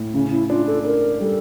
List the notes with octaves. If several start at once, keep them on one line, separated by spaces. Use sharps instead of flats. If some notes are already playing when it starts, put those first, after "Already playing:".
Already playing: A2
C#3 C#4
E4
D4 F4
A4
D4 A#4
G3 A4